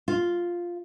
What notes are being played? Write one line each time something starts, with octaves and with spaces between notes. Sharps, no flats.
F4